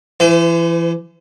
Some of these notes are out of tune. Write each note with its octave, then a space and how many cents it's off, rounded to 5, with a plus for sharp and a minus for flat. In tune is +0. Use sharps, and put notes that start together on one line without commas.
E3 +30 C5 -40